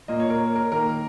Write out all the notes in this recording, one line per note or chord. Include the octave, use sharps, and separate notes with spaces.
A#2 A#3 D#5
C#5
A#4
A#4
D#3 A#3 A#4